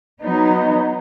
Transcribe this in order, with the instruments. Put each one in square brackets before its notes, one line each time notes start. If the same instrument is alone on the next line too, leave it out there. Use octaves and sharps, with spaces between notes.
[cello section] F#3 B3 D#4